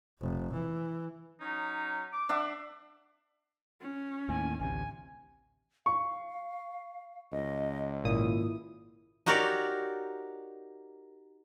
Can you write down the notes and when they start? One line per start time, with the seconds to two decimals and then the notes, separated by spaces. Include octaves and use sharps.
0.20 F1
0.53 E3
1.41 F#3 C#4 D#4
2.12 D6
2.29 D4 E5 F#5
3.81 C#4
4.29 D#2 A2 G#5
4.60 A1 D2 C3 G#5
5.86 F5 C#6
7.32 C#2 D#5
8.04 G#1 A#2 E4 D#6
9.26 D#4 F#4 G4 A#4 C#5 D5